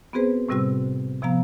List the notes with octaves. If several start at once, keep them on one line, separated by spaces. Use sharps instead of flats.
B3 C4 F#4 G#4 B4 C5
A2 C3 G3 C4 F#4 E6
C3 F3 B3 F5 A#5